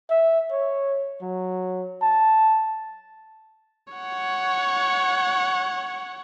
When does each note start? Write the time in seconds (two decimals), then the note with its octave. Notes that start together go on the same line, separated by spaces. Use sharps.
0.10 E5
0.52 C#5
1.22 F#3
2.02 A5
3.93 C#5 F#5